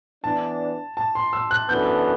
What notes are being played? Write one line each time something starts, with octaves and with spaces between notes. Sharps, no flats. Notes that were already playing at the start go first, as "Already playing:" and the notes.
E3 B3 D4 A5
A5
C6
E6
F#6
F#2 E3 B3 D4 A4 G6